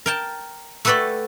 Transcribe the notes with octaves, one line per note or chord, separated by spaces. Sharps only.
A#4 G5 A5
A3 F#4 A4 B4 D5 G5